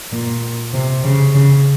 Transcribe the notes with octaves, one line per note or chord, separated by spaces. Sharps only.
A#2
C3
C#3
C#3